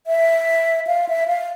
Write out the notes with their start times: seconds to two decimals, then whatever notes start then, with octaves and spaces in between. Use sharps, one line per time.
0.07 E5
0.87 F5
1.09 E5
1.28 F5